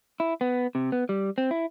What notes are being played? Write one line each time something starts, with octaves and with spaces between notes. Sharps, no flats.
E4
B3
C3
B3
G3
C4
E4